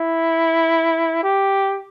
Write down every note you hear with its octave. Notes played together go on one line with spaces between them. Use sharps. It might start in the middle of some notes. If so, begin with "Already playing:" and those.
Already playing: E4
G4